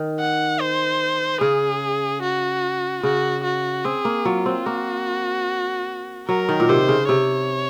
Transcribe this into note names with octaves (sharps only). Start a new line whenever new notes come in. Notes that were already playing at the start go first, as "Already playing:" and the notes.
Already playing: D#3
F#5
C5
C#3 G#4
F#4
C#3 F#4
F#4
C4 G#4
A#3
F#3 F4
C4
A#3 F#4
F#3 A#4
D#3
A#2
C3 C5
C#3
C3 C#5